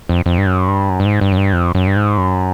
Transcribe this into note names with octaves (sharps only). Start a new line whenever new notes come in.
F2
F2
G2
F#2
G2
F#2
G2
G#2
G2
F#2
G2
F2
F#2
G2
G#2
F#2